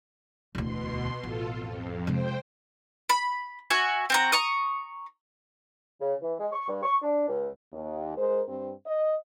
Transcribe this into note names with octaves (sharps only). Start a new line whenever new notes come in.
E1 D2 B2 C6
A1 F4 A4
F2
C3 G#3 C5 G5
B5
F#4 E5 G#5
C4 F#4 A#5
A#5 C#6 D#6
C#3
E3
G#3
C#6
G2
C#6
D4
C#2
D#2
G#3 A#4 C5
G2 C4
D#5